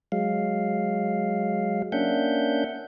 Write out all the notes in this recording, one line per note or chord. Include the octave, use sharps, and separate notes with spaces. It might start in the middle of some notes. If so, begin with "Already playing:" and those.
F#3 G#3 F5
A#3 C#4 D4 E5 F#5 G6